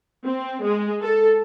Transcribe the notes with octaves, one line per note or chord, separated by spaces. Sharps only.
C4
G#3
A4